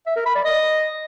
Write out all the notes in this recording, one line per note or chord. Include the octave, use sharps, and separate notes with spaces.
E5
A#4
B5
D5
D#5